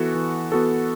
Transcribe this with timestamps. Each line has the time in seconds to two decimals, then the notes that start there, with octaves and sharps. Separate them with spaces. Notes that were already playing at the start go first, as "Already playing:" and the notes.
Already playing: E3 B3 F#4 A4
0.15 E3
0.52 B3 F#4 A4